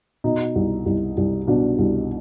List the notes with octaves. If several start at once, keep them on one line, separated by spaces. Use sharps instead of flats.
B2 D#4
C2
C2
C2
B2 D4
C2